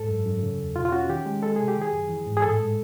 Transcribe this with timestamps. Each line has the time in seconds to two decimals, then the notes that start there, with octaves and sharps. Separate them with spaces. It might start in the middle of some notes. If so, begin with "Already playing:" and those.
Already playing: G#2 A4
0.09 F#2
0.26 F#2
0.43 C#3
0.59 E2
0.75 B2 F4
0.85 F4
0.92 C#4 F#4
1.09 D#3 G4
1.26 G#3
1.43 G#3 A4
1.56 C3 G#4
1.68 G4
1.76 D#3
1.82 G#4
1.92 F#2
2.09 E3
2.26 G#2
2.37 G#4
2.42 A2 A4
2.60 G#3